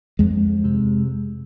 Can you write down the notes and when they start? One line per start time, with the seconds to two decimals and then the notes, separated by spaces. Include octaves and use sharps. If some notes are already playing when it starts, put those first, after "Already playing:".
0.19 F2 G#3
0.64 C3